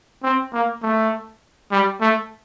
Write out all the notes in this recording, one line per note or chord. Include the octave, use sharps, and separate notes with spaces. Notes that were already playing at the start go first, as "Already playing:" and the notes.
C4
A#3
A3
G3
A3